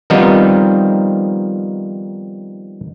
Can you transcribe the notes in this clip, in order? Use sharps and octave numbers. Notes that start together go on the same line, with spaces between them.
D#3 F3 G3 B3 C4 D#4